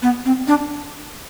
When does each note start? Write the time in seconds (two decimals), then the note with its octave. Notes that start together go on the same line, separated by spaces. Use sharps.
0.02 B3
0.25 C4
0.47 D4